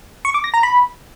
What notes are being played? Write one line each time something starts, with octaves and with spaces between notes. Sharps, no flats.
C#6
D6
A#6
A#5
B5